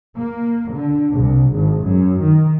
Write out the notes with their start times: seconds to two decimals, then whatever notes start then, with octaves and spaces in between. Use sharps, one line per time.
0.18 A#3
0.71 D3
1.12 C2
1.52 G#1
1.86 F#2
2.22 D#3